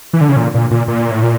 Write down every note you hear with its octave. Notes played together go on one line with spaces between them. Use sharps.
E3
D3
C#3
A#2
A#2
A#2
A#2
A2
A#2